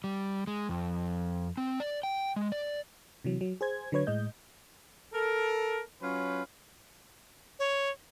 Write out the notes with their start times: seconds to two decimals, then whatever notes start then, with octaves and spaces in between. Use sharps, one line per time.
0.04 G3
0.47 G#3
0.69 F2
1.57 C4
1.80 D5
2.03 G5
2.36 G#3
2.52 D5
3.24 C3 E3 F#3
3.41 F#3
3.61 G#4 C5 G#6
3.92 D3 F#3 B4 C#5 G#6
4.07 A2 G#3 D#5 G6
5.12 A4 A#4
6.01 F#3 C#4 F4 B4
7.59 C#5